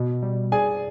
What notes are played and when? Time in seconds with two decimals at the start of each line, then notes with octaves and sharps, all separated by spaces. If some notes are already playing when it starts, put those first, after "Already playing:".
Already playing: B2 B3
0.22 G3
0.52 G#4 D5 G#5